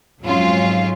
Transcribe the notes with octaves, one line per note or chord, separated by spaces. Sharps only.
F2 G#2 F#3 C#4 F4